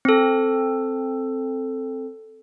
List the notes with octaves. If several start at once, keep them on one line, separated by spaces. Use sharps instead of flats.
C4 A4